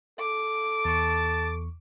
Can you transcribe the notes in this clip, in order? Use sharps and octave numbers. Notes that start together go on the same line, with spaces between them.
A4 D6
E2 A5 C#6